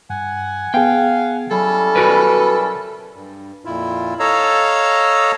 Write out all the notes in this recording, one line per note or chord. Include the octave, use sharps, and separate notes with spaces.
G2 F#5 G#5
B3 G#4 F5 G5
F#3 G3 C#4 E4 A4 G#5
F#4 A#4 B4
G2
F2 A#2 E4 F4
A4 C#5 D#5 F5 A#5 E6